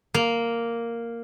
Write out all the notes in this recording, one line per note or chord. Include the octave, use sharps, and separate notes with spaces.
A#3